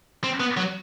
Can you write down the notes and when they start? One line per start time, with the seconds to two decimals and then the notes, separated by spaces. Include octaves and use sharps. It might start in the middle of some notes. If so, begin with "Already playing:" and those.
0.24 C4
0.40 B3
0.57 F#3